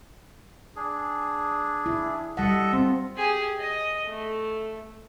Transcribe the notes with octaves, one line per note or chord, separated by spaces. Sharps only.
D4 G#4
E4
G3 A4 D#5 E5 F#5
C4 F4
G4 G#4
D#5
A3